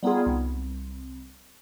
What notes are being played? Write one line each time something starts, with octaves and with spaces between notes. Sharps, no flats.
G3 B3 D#4 F4 G#4
C2